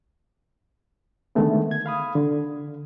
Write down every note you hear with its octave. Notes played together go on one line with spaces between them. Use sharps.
D3 D#3 G#3 A3 B3
G#6
F5 B5 D#6
D3